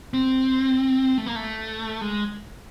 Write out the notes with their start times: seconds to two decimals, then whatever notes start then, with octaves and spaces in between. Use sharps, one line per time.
0.14 C4
1.18 A3
1.26 A#3
1.36 A3
2.01 G#3